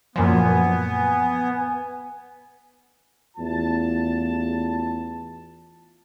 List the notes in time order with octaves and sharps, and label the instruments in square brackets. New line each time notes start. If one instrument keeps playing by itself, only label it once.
[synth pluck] F#2 A#2 F3 [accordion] B3 [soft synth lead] G#5
[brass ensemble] A1 E2 F4 A5